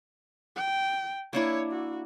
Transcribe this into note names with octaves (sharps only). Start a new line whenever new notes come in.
G5
A#3 D4 E4 C#5
F#4